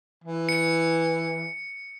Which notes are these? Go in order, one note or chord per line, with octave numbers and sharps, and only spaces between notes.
E3
C#7